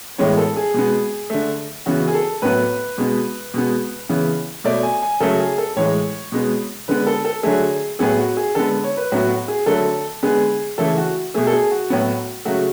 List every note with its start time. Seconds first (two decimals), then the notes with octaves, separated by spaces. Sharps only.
0.18 A2 E3 G#3 B3 C#5
0.37 A4
0.56 G#4
0.74 B2 G#3 B3
1.30 D3 A3
1.86 C#3 E3 B3 F#4
2.08 G#4
2.15 A4
2.42 A2 F#3 B3 B4
2.98 B2 G#3 B3
3.54 B2 G#3 B3
4.09 C#3 E3 B3
4.64 B2 A3 D5
4.83 G#5
5.02 G#5
5.20 C#3 F#3 A3 A4
5.40 G#4
5.58 A4
5.76 A2 E3 G#3 C#5
6.32 B2 G#3 B3
6.88 D3 G#3 B3 B4
7.07 A4
7.25 A4
7.43 D3 F#3 A3 G#4
7.99 A2 F#3 B3 G#4
8.19 F#4
8.37 G#4
8.55 D3 G#3 B3 A4
8.84 C#5
8.97 B4
9.12 A2 F#3 B3 F#4
9.29 F#4
9.48 G#4
9.66 D3 F#3 A3 A4
10.23 D3 G#3 B3 G#4
10.78 C#3 E3 A3 A4
10.98 F#4
11.34 B2 A3 G#4
11.47 A4
11.53 G#4
11.71 F#4
11.90 A2 F#3 B3
12.45 C#3 F#3 A3 F#4